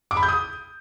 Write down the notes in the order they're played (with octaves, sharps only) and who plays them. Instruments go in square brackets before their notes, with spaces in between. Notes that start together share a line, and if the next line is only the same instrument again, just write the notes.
[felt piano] D6
B5
G6
D#6